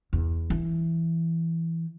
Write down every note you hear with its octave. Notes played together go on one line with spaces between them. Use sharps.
E2
E3